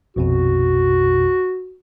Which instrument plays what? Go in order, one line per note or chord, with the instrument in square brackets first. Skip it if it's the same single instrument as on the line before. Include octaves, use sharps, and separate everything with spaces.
[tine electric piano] A#1 F2 B2 [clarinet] F#4